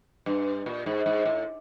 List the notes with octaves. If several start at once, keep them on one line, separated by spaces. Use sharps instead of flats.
G2
A#2
G#2
G#2
A2